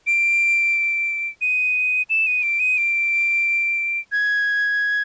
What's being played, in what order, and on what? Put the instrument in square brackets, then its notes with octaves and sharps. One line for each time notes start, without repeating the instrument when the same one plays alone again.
[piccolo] D7
D#7
E7
D#7
D7
D#7
D7
G#6